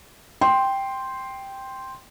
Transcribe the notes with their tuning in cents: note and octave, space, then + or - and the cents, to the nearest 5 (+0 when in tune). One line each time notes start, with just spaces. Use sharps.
G5 +0 C6 +0